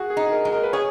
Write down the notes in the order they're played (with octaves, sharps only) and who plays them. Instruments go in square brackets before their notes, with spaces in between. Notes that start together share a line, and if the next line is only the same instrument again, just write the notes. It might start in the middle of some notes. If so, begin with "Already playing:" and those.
Already playing: [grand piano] F#4 G#4
G#4
[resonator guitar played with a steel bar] D#4
[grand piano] G#4
A#4
[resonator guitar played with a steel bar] G#3
[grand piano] A#4
B4
[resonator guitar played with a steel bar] G#4 [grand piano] C#5